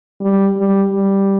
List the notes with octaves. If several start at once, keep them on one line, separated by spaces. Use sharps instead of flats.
G3
G3
G3